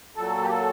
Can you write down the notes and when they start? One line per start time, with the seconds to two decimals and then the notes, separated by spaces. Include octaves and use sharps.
0.16 A#2 F#3 A4
0.44 G4
0.50 A4